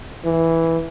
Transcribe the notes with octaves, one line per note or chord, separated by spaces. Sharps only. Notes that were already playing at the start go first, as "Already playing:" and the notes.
E3